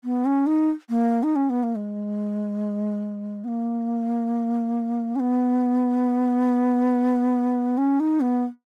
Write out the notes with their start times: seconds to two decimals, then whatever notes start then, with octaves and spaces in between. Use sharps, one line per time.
0.04 B3
0.25 C#4
0.47 D#4
0.89 A#3
1.23 D#4
1.36 C#4
1.50 B3
1.63 A#3
1.75 G#3
3.44 B3
3.48 A#3
5.16 C#4
5.20 B3
7.78 C#4
8.00 D#4
8.21 B3